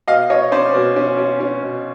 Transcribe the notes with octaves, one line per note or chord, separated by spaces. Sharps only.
B2 D#5 F5
B2 C#5 D#5
C#4 C5 D5
B2
C#4
C#4
C#4
B2